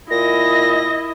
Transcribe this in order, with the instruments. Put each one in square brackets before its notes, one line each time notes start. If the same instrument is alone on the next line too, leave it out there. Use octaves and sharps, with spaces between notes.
[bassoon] A#2 [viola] E4 D#5 [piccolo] A#6